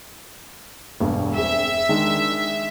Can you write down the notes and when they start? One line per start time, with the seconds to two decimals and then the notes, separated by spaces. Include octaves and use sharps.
1.00 E1 G2
1.37 C4 G#4 E5
1.89 D#3 G#3 D4